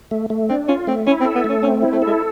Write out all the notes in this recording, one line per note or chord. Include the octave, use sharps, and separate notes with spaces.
A3
A3
C4 D4
C#4 F4
A3 C4
C#4 E4
C4
A4
B3
A3
C#4
C4 C#4
E4
A3
G#3 A4